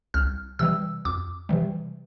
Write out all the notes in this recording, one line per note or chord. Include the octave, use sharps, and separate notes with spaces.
C2 F6
C3 E3 G3 E6
F2 D6
C3 E3 G3